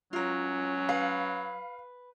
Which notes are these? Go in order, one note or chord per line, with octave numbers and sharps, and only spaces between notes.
F#3 C#4 F4 A#4
B4 F5